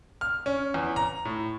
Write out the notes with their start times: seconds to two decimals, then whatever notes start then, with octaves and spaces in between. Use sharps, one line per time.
0.21 F6
0.46 C#4
0.74 E2
0.96 A#5
1.25 A2